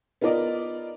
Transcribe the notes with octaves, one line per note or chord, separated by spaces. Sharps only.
B3 D#4 F4 A#4 D5 D#5